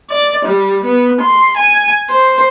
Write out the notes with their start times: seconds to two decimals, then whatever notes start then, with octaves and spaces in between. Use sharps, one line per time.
0.11 D5
0.45 G3
0.85 B3
1.21 C6
1.57 G#5
2.10 C5